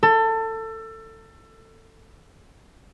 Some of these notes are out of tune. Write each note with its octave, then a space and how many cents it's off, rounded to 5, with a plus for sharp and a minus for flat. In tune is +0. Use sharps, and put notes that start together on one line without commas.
A4 +25